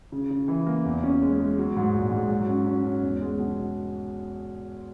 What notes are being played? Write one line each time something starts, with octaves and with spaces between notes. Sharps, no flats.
C#3
C#3
E3
A#3
E2
C#4
G#3
G#3
F#3
G#2
A#1
G#2
F#3
C#4
C#4
C#4
E2
G#3
B2